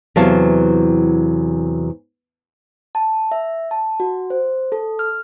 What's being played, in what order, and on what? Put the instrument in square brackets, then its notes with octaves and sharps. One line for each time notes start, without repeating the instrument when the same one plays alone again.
[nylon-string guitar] E2 C3 E3 F#3 F5 A5
[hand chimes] A5
E5
A5
F#4
C5
A4
F6